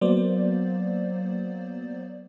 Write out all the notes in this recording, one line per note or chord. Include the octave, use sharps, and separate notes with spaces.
F#3 A#3 B3 C5 D5